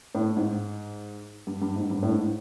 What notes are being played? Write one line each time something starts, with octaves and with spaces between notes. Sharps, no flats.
A2
G#2
G2
G2
G#2
G2
A2
G#2